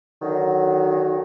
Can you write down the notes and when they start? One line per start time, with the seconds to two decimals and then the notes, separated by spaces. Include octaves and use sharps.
0.22 D3 D#3 F#3